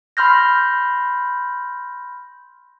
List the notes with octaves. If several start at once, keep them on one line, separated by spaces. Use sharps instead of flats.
B5 C6 F6 G6 A#6